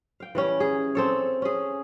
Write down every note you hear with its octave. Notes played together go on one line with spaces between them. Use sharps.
F5 G5
E3 G3 C#4
G#4
C4 A4 C#5
C#4 G#4